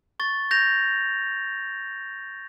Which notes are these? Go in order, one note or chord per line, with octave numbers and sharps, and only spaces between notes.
C#6 A6
G6 A#6 F7